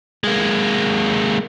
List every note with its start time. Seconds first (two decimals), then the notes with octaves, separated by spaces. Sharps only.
0.24 G#3 A#3